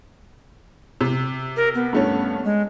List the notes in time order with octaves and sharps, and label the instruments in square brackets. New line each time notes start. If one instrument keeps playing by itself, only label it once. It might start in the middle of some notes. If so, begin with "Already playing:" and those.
[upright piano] C3
[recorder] A#4
B3
[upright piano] G2 A3 C#4
[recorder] G#3